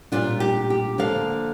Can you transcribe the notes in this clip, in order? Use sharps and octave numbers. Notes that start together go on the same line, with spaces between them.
A#2 G3 D4 F4
G4
G4
D3 F3 A#3 F5